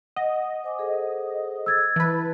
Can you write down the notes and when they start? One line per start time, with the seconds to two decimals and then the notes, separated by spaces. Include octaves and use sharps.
0.16 D#5 F#5
0.64 C5 G#5 D6
0.79 G#4 A4 C5
1.66 E6 G#6 A6
1.96 E3 B4 A5